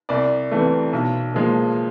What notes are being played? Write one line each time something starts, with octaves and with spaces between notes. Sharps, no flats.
C2 D5
C3 E3 A3
B1
A#2 F3 G#3